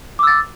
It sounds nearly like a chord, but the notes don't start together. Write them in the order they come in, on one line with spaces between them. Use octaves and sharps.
D6 E6 A6